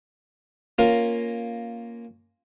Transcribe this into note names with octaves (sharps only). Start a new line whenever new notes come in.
A#3 C#4 F4 A#4